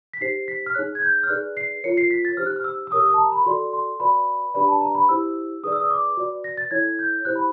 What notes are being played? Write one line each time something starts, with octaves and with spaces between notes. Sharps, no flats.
B6
D#4 G4 C5 C7
B6
F6
D#4 G#4 C#5 F#6
G#6
G6
F6
D#4 G#4 B4 D5 F#6
C7
F4 A#4 C#5 C#7
C7
B6
A6
D#4 G4 C5 F6
F#6
F6
E6
E6
G4 A#4 C#5 D#6
D#6
A5
A#5
B5
F#4 A4 D5 C6
C6
F#4 B4 D5 B5
D4 G4 B4 D5 B5
A5
A#5
B5
E4 G4 C5 E6
D#4 G#4 B4 D5 D#6
E6
D#6
D6
F#4 B4 D5
A#6
A6
E4 A4 C#5 G#6
G6
E4 G4 C5 F#6
B5